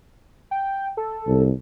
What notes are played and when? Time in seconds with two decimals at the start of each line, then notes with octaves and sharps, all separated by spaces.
0.51 G5
0.97 A4
1.27 C2